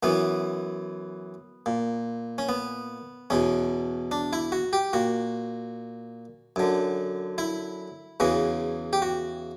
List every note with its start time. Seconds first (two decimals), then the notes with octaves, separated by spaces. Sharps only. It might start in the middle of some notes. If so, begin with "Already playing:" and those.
0.03 F#2 E3 B3
1.66 A#2
2.38 C#4
2.49 B3
3.30 E2 B2 C#4
4.11 D4
4.33 E4
4.52 F#4
4.73 G4
4.93 A#2 F#4
6.56 F#2 D3
7.38 E4
8.20 E2 C#3 E3 F#4
8.93 G4
9.02 F#4